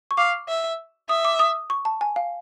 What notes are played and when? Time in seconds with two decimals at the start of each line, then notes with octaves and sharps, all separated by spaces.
0.11 C#6
0.17 F5 D6
0.49 E5
1.09 E5 D#6
1.25 D6
1.39 D#6
1.70 C#6
1.85 A5
2.01 G#5
2.16 F5